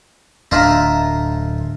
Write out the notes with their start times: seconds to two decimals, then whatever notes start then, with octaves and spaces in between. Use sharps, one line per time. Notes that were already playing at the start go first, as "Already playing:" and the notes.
0.51 D1 D4 D#4 F4 E5 A#5